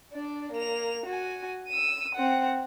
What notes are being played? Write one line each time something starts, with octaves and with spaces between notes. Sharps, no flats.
D4 D5
A#3 F7
F#4 G#5
E6 D#7
C4 F#5